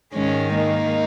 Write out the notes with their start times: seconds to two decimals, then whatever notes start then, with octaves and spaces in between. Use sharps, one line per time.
0.13 G#2 D#3 G#3 C#4
0.54 A#3 D#4